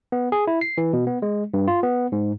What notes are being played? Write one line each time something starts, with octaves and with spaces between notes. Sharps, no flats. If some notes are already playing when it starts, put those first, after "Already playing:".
B3
G#4
E4
C7
E3
B2
B3
G#3
G2
F4
B3
G#2